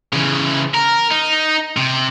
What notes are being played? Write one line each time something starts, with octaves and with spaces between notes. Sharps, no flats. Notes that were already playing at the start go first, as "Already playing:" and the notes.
C#3 E3
A#4
D#4
C3